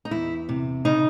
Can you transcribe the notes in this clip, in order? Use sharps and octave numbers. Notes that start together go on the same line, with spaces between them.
D#4
E2 E4
C3
C#3 D#4